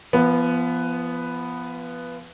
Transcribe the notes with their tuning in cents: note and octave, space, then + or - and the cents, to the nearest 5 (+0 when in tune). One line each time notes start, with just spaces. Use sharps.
F3 -30 B3 +0